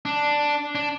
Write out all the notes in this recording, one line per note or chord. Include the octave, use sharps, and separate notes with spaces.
D4
D4